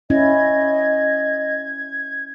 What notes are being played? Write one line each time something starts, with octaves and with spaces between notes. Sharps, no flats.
C#4 E4 D#5 G#6